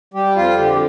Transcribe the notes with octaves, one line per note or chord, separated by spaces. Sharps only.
G3 G4
F2 F4
D3 G4